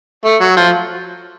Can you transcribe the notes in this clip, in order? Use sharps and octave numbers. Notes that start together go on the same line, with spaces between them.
A3
F#3
F3